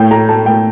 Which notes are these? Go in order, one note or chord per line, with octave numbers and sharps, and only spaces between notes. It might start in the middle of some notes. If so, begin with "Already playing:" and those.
Already playing: A2 G5
A3 A#5
A3 A5
A2 G5